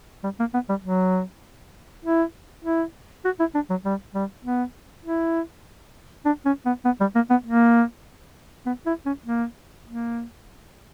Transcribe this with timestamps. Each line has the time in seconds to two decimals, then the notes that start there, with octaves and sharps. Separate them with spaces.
0.24 G3
0.40 A#3
0.54 B3
0.69 G3
0.84 F#3
2.05 E4
2.65 E4
3.25 F#4
3.40 E4
3.55 D4
3.70 F#3
3.85 G3
4.15 G3
4.45 B3
5.05 E4
6.25 D4
6.46 C#4
6.66 B3
6.85 B3
7.01 G3
7.15 A#3
7.30 B3
7.46 A#3
8.66 B3
8.86 E4
9.06 C#4
9.26 A#3
9.87 A#3